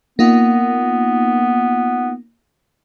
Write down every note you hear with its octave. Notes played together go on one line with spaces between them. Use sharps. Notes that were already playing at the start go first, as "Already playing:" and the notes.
A#3 B3 D#4 F4